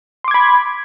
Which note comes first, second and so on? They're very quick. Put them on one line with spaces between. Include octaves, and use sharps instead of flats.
C6 D6 G#6 B5